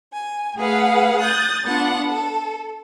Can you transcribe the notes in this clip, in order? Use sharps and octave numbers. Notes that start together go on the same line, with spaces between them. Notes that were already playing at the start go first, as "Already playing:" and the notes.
G#5
A3 G#4 B4 F5 F#5
D#6 F#6 G6 A6
B3 D4 F4 F#5
A4